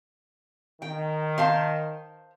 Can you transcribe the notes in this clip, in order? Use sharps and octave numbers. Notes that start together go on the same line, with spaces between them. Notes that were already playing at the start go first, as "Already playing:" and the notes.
D#3 G5
C5 F5 A5